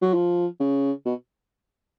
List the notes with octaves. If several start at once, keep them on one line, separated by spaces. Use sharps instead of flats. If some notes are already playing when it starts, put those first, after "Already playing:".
F#3
F3
C#3
B2